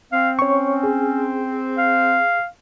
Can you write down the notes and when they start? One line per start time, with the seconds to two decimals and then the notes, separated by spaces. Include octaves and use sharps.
0.13 C4 F5
0.39 C#4 C#5 C#6
0.83 G#4
1.78 F5